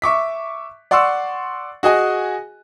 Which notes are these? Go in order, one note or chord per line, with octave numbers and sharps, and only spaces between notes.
E5 C#6 D6 B6
D5 F#5 C6 C#6 E6
F#4 G#4 D#5 G#5